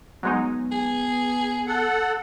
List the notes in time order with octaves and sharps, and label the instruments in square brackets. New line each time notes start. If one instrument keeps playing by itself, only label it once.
[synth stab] F#3 G#3 D#4 [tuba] B3
[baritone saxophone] G#4
[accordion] A4 F#5